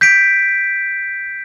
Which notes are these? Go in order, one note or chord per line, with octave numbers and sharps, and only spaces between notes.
G6 B6 D7